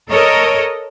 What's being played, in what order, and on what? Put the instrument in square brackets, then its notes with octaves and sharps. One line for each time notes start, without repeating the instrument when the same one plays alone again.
[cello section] A4 A#4 C#5 D#5